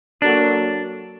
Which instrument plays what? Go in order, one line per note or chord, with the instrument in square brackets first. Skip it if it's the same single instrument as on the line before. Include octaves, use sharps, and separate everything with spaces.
[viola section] F#3 A#3 F#4 A4 [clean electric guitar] D4